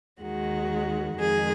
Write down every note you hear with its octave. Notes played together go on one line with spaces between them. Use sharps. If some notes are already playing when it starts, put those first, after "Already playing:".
D#2 D#3 G#3 F#4
F2 D#3 G#3 G#4